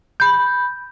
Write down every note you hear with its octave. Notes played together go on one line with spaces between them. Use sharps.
B5 G6